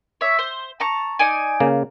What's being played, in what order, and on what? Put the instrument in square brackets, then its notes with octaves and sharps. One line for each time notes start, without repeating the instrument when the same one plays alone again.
[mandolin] C#5 E5
C5
A5 A#5 C#6
D#4 D5 G#5
[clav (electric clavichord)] C#3 A#3